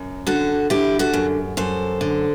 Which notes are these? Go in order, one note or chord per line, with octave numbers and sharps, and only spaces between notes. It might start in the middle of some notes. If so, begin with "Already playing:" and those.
Already playing: F#2
D3 F#4 A4
D3 E4 G4
F#4 A4
F#2
F#2 A4 C5
D3